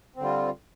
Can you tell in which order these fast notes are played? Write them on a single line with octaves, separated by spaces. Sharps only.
C4 D3 G3 F4